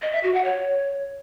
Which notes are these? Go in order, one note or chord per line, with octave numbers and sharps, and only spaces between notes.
D#5
E5
F#4
F#5
C#5